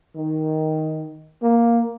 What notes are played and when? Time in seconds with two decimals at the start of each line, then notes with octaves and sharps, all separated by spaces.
0.16 D#3
1.42 A#3